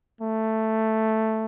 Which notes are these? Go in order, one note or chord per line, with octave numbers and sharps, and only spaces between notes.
A3